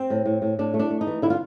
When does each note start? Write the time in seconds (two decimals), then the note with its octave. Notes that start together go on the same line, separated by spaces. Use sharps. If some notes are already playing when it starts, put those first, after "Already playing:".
Already playing: C4
0.10 A2
0.26 A2
0.42 A2
0.59 A2 D4
0.74 A3
0.79 D4
0.90 A3
1.01 D#4
1.07 E3
1.22 D3 E4
1.30 F4